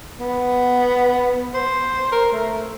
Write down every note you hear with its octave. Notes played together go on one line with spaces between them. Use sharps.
B3
C5
A#4
A3